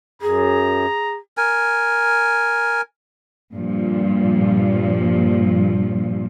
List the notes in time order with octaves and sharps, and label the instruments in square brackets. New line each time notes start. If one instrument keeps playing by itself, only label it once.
[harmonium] F#2 [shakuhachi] G#4 [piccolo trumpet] A#5
[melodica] A#4 G#5
[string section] G2 A#2 F3